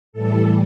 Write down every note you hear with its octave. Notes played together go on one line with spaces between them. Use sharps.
A2 E3 G3 A4